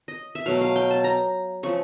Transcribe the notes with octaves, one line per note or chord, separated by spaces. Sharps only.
D#5
E5
B2 F#3 A3 F5
F5
G5
A5
A#5
C#3 F3 A3 C#6